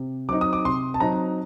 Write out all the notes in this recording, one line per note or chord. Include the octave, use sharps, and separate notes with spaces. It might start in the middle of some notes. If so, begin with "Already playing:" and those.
Already playing: C3
F#3 C4 D#4 D6
D#6
D6
C3 C6
A5
F#3 C4 D#4 A#5